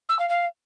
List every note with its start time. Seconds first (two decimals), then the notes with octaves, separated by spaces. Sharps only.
0.09 E6
0.19 F5
0.29 F5